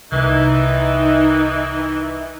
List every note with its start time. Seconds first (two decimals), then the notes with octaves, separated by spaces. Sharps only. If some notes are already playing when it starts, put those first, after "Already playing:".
0.12 C2 D#3 E3 D#4